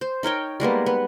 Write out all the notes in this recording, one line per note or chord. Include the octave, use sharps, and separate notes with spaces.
C5
D#4 A#4 C#5 G5
G3 G#3 A#3 B3
B3